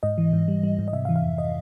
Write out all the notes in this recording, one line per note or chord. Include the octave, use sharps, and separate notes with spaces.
G#2 D#5
E3
G#2
G3
G3
G#2
D#5
C3 E5
F5
E3
F5
F2
D#5